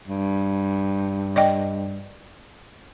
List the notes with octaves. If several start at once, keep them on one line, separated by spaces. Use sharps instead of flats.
G2
D5 D#5 G5